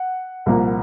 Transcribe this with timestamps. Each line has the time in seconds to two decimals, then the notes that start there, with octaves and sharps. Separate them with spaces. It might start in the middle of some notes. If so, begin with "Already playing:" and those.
Already playing: F#5
0.46 C2 A#2 F3 A#3